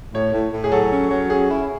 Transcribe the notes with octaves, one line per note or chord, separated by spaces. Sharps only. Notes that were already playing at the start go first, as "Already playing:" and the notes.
A2 C#5
A2
A2
G#4
F#3 A4
C#4
F#3
C#4 G#4
E4